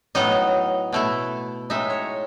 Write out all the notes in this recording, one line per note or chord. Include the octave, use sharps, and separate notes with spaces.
A2 F#3 B3 D#4 D#5
B2 A3 E4
A2 G#3 D#4 E5
C#5